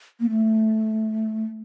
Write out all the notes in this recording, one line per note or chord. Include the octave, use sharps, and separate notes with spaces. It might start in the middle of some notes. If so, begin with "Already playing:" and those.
A#3
A3